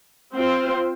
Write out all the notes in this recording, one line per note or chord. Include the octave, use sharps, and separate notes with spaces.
C4 F4 C5